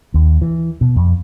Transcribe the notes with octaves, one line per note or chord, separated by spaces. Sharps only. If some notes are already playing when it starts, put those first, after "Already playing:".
D#2
E3
B2
F2